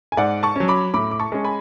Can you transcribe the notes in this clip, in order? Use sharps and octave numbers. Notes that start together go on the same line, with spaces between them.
G#5
G#2 D5 F#5
A5 C#6
F#3 C#4
B5 D6
A2 B5 D6
D6
A5 C#6
G#3 C#4
G#5 B5